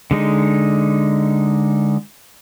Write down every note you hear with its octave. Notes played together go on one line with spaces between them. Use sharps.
D3 G#3 D#4